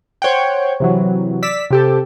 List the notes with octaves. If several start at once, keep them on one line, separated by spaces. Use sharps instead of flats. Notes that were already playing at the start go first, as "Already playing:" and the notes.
C5 C#5 F#5 G5
C3 E3 F#3
D5 E6 B6
C3 G4 A4